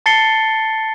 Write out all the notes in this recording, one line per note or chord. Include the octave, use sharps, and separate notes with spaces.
A5 A6 C7 C#7 G7